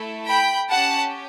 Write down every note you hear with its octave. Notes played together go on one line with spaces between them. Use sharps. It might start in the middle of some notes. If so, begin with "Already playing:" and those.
Already playing: A3 E4 A4
G5 B5
C#4 G4 F#5 A5